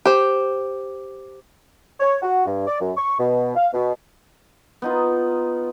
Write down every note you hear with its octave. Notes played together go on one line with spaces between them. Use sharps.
G4 C5
C#5
F#4
G2
D5
F#2
C#6
B2
F5
B2
B3 D#4 F4